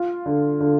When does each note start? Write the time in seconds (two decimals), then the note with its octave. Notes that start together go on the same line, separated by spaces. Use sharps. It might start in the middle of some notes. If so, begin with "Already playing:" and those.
Already playing: F4
0.26 D3
0.60 D3